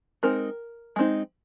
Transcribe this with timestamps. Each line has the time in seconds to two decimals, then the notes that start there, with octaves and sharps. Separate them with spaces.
0.23 G#3 C4 D#4 A#4
0.96 G#3 C4 D#4